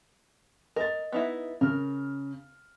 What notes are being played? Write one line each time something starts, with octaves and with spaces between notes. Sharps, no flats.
A#4 D#5 A6
B3 D#4 E4
C#3 A#4 F6